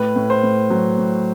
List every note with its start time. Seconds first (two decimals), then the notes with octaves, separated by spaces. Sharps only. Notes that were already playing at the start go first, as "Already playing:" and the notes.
Already playing: A2 B4
0.16 A2
0.30 C5
0.43 A2
0.70 F#3
0.98 A2